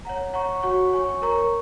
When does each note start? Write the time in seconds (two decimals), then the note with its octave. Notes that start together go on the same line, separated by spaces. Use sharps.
0.05 C#5 F#5 A#5
0.34 C#5 F#5 A#5 C#6
0.63 F#4 C#5 F#5 C#6
0.93 C#5 G#5 C#6
1.22 A#4 C#5 A#5 C#6